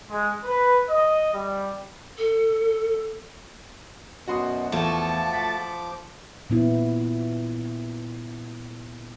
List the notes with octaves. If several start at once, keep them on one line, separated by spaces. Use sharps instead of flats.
G#3
B4
D#5
G3
A4
F#2 B2 F#4 C6 D#6
E2 F3 A3 F4 F#4 A5 D6
F#5 B6
A#2 B3 E4